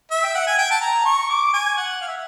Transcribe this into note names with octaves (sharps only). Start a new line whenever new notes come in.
E5
G5
F#5
G#5
G5
A5
A#5
C#6
D6
G#5
F#5
F5
E5